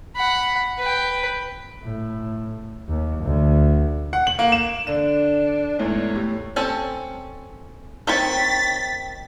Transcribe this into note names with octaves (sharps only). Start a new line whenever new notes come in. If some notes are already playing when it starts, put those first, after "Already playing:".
F#5 B5
B4 G5
A2
D#2
D2
F#5
F#7
A#3
E7
D3 D4 E7
E2 G#2 A3 C#5
A2 G4
C4 C#4 A4
D#3 C4 C#5 A6 B6